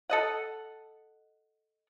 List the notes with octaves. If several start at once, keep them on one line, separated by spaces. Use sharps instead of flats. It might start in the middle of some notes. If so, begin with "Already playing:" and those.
A4 D#5 F#5